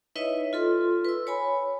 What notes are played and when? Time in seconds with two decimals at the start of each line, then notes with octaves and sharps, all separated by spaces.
0.16 D#4 E4 B4 C#5 D#5 E5
0.53 F4 A4 C6
1.05 B4 E6
1.27 C#5 G#5 B5